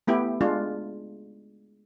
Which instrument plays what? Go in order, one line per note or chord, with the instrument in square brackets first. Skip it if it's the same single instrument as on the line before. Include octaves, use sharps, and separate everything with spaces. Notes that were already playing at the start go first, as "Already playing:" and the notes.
[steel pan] A3 B3 E4 G4
G#3 D4 F4